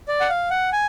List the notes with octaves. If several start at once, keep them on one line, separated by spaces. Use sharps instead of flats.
D5
F#5
F5
F#5
G#5